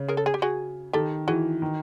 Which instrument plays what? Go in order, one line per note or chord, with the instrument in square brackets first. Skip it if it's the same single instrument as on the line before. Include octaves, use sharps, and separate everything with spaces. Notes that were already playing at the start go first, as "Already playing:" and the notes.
Already playing: [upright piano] C#3
[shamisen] G#4 A#4
A4
G#4
G4
F#4 G#4
[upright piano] D#3 [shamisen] G4 A4
[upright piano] E3 [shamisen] F#4 G#4
[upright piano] D#3